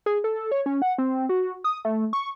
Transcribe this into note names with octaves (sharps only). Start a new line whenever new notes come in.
G#4
A4
C#5
C#4
F#5
C4
F#4
D#6
A3
C#6